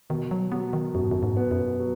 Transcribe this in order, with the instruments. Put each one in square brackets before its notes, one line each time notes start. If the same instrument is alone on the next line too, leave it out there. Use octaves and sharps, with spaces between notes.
[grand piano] B2 [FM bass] D#3
[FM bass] F#3
[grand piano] F#3 [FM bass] B3
[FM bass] D#3
[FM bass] F#2 [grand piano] B2
[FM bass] G#2
F#2
G#2
[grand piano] B3
[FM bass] F#2
[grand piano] F#3